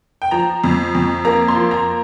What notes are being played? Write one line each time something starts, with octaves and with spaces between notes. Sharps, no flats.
G5
F3 A#5
F2
F2
A#3 A#5
C6
F3
A#5